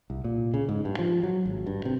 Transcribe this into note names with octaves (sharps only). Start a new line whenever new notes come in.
C2
A#2
C#3
G#2
G2
F3
F#3
G#1
G2
C3